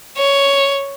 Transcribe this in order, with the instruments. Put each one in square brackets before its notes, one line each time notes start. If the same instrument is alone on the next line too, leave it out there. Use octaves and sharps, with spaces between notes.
[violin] C#5